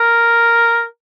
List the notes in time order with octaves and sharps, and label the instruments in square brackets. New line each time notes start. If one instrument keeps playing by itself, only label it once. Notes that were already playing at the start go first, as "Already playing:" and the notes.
Already playing: [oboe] A#4